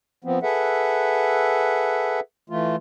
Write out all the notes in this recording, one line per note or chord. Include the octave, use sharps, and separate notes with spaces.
F3 B3 C4
G#4 A4 B4 E5 F#5
E3 A3 F4